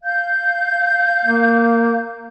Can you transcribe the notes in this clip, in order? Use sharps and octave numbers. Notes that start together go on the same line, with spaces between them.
F5 G6
A#3